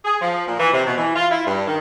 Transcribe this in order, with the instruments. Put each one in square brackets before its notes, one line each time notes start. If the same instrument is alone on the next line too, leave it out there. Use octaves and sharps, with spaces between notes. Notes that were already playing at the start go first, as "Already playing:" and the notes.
[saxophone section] G#4
F3
A#2
E3
C3
B2
E3
F4
E4
G2
D#3